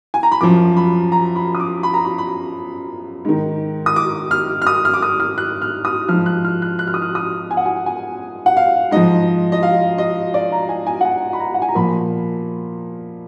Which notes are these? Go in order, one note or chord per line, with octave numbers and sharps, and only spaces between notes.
G#5
A#5
B5
F#2 F3 D6
B5
A#5
B5
D#6
D6
B5
A#5
B5
B5
G#2 D#3
D#6
D6
F6
F6
D#6
F6
D6
D#6
F6
F#6
F6
D#6
G#2 F3 F6
F#6
F6
F#6
F#6
F6
D#6
F6
D#6
G#5
F#5
G#5
G#5
F#5
F5
G#2 F3 D#5
D#5
F5
D#5
D5
A#5
G#5
G#5
F#5
G#5
B5
A#5
F#5
G#5
A#5
A#2 F3 B5